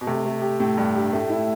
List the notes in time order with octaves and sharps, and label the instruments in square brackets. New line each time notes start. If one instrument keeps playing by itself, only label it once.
[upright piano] B2
[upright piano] C3 [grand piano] A3
[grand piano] A3
G4
[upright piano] A2 [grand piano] G4
[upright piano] G2 [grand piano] G4
[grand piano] G4
[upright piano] A2 [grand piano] A3
[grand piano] E4